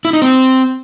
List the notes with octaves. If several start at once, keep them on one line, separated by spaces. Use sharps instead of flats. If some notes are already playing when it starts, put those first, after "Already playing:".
E4
D#4
C4